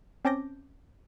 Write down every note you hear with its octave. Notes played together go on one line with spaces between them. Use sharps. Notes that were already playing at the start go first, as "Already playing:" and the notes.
C4 C#4 A5 D6 G6 A#6